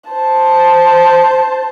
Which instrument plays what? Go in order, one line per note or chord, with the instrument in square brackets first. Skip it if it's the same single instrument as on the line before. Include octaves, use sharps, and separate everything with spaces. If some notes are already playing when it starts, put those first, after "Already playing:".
[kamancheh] C5 A5